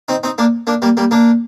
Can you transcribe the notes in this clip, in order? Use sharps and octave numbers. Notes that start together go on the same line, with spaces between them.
C4 D#4
C4 D#4
A#3 D4
A#3 D4
G3 A#3
G3 A#3
A#3 D4